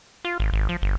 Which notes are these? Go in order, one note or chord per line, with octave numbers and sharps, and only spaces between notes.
F4
G#1
G#1
F3
G1